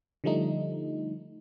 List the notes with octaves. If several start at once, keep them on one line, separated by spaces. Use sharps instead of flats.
D3 F3 G3 A3 D#4